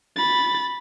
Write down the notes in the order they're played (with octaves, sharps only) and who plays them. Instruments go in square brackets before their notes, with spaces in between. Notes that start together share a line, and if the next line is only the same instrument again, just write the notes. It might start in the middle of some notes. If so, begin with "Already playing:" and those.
[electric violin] B5 A6